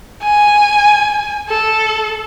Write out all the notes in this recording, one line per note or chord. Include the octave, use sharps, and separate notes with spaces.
G#5
A4